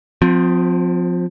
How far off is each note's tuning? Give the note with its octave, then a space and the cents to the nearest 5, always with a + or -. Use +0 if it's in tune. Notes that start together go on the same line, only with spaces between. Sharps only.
F3 +25 C4 -15